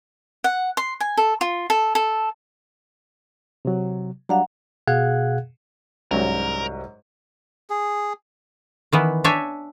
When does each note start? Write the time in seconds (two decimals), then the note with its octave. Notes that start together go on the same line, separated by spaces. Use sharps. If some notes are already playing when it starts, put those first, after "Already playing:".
0.44 F#5
0.77 C6
1.00 G#5
1.17 A4
1.41 F4
1.70 A4
1.95 A4
3.65 C3 F#3
4.29 F#3 G3 D4 F5 F#5 A#5
4.88 B2 G#4 F5 F#5 F#6 G#6
6.11 C2 G#2 F#3 C#4 A#4
7.70 G#4
8.92 D#3 E3 B3
9.24 D4 C#5 E5 G#5